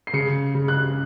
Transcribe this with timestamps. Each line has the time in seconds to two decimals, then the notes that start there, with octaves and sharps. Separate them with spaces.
0.07 C7
0.13 C#3 C#7
0.55 C#3
0.68 F#6